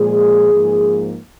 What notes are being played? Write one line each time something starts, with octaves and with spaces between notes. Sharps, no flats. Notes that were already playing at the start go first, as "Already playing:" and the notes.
Already playing: A#2 F3 G#3 G#4
G#2 F3 A#3